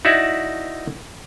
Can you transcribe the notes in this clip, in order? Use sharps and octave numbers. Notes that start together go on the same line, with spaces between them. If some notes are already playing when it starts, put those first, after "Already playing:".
D#4 E4 F#4 D5 E5